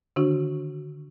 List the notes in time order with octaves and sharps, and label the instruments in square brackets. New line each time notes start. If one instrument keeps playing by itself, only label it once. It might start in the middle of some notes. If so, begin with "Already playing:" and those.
[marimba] D3 D#3 D4 F#4